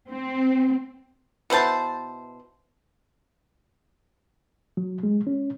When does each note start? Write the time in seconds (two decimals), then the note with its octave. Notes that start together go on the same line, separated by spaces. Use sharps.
0.11 C4
1.50 B2 E4 C5 A5
4.77 F#3
5.03 G#3
5.27 C#4